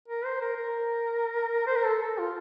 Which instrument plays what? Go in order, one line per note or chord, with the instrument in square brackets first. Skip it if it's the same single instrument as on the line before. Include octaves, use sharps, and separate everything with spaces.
[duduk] A#4
C5
A#4
A#4
C5
A#4
A4
A4
F4